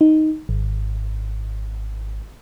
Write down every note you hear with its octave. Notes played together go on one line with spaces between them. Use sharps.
D#4
G#1